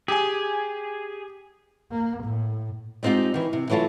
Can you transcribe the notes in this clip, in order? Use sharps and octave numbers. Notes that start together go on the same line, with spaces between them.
G4 G#4 G#5
A#3
A2
G3 G#3 C4 D#4 F4 G4
D#3 E3
C3
E3 F#3 A3 F4 A4